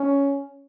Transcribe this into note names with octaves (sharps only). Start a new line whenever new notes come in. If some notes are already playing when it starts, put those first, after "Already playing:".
Already playing: C#4